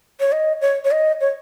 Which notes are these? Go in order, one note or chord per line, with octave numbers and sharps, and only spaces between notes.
C#5
D#5
C#5
C#5
D#5
C#5